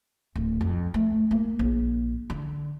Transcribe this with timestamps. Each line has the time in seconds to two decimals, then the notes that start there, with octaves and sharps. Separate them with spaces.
0.36 D1
0.61 F2
0.94 A3
1.31 A#3
1.59 A#1
2.30 D3